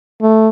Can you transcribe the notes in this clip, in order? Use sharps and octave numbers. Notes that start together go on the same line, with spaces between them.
A3